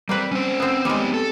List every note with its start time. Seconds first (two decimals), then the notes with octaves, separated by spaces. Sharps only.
0.09 G3 A#3 C4 B4
0.31 C#4 C5
0.60 B3 C4
0.85 G3 G#3 B3 D#4 B4
1.14 A4